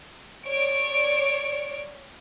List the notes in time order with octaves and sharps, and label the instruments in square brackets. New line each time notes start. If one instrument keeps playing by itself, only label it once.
[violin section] C#5 D5 D7